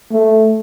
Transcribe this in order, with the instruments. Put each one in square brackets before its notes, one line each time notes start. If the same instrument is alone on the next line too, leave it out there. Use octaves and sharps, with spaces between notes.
[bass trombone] A3